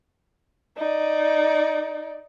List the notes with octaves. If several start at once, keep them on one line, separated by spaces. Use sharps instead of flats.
D#4 D5